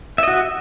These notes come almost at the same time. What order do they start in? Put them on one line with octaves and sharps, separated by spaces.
E5 D#5 F#4